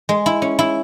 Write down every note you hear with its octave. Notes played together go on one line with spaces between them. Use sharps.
G#3
E4
C#4
E4